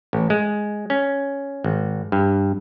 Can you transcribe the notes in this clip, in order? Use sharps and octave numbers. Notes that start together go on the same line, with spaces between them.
A1
G#3
C#4
G#1
G2